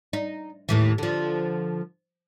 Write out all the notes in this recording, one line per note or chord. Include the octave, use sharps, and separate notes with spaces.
D#4
D#2 A2 E3
D3 F3